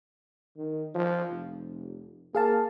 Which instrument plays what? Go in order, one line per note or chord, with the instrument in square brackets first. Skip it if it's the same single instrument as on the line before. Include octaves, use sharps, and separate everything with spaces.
[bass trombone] D#3
F3
F1
[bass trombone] A#3 [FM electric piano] G#4 F5 A5